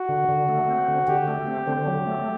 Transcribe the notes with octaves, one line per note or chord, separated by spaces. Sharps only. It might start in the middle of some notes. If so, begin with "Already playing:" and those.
Already playing: F#4
D3
D3
A3
C4
D3
D3 G4
A3
C4
D3
F#3
A3